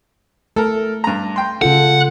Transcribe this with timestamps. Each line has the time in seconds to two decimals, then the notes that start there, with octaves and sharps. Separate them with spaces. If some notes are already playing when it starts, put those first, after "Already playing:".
0.56 A3 A4 A#4
1.04 G2 A#5
1.36 G5 C6
1.62 C#3 F4 A4 F#5